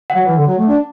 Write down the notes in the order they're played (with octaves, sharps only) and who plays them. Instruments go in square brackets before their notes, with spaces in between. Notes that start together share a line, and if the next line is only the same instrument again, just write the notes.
[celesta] F#5
[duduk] F#3
E3
D3
F#3
A3
D4